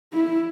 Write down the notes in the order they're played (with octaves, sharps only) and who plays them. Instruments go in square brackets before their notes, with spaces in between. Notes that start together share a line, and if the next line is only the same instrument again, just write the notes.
[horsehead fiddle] E4